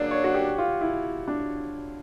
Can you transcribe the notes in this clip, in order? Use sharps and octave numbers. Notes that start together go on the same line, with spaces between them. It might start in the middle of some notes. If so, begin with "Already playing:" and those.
Already playing: C#3 F#3 A#3 D4 D5
C#5
F#4
G4
F4
E4
D4